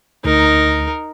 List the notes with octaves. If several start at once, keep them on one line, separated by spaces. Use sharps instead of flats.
D2 D#4 A#4